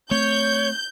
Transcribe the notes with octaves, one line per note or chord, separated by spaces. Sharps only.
A3 C4 C#5 G6